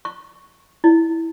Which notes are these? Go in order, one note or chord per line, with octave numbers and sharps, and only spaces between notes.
C#6
E4